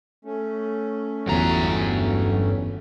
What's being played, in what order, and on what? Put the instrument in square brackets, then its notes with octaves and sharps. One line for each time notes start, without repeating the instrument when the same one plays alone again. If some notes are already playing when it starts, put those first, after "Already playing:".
[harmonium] A3 C#4
[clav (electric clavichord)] G1 E2 [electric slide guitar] G2 A#5 [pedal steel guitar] F#3